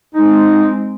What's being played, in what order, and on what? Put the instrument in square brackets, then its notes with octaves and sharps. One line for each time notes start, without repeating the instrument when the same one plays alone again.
[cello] G#3 C4 [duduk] D#4